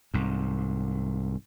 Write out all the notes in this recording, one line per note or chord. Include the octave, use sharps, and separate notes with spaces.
C2 G#2